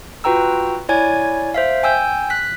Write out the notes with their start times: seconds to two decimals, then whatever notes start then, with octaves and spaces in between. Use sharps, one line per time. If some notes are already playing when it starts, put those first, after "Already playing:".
0.24 F4 F#4 B4 G5 A#5 E6
0.89 E4 C#5 D5 G#5 G#6
1.54 C5 E5 F5
1.83 G5 G#5 E6 G6
2.30 F#6 B6